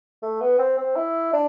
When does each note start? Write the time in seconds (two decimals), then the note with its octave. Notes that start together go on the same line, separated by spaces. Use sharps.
0.22 A3
0.41 B3
0.59 C4
0.78 C4
0.96 E4
1.33 D4